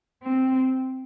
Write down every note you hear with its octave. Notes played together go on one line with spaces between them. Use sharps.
C4